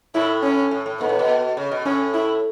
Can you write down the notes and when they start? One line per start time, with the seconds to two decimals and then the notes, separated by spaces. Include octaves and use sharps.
0.15 A2 E4
0.43 C#4
0.71 A2
0.86 A2
1.00 G#2 B3
1.09 A2
1.19 B2
1.57 C#3
1.72 B2
1.86 A2 C#4
2.14 E4